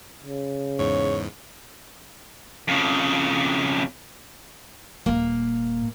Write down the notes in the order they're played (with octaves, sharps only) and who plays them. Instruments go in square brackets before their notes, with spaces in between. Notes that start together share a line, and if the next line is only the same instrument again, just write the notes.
[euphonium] C#3
[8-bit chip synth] E2 G#2 [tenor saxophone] C#5
[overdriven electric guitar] F2 C#3
[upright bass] D#1 A#2 [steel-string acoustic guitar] A#3